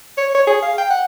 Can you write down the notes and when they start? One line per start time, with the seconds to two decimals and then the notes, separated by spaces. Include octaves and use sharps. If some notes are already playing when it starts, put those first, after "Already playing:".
0.18 C#5
0.35 C#5
0.47 G#4
0.62 F5
0.78 G5
0.90 F#5